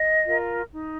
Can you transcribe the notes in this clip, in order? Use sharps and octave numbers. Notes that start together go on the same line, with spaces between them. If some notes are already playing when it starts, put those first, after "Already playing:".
Already playing: D#5
F4 A#4
D#4